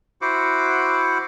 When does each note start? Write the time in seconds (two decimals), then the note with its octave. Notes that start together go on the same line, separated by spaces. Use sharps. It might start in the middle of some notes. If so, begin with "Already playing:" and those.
0.22 E4 F#4 C5 F#5 D6